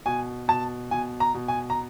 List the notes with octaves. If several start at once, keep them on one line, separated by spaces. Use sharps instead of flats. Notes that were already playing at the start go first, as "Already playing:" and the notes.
B2 G#5
B2 A5
B2 G#5
A#5
B2
G#5
A#5